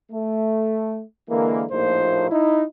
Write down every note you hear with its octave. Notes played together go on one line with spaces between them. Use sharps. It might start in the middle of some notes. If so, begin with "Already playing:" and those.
A3
D3 E3 G#3 A#3
A#1 A2 F3 A#3 D#4 C5
D#4 E4